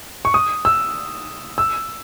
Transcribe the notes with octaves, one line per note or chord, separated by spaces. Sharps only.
C#6
D#6
E6
E6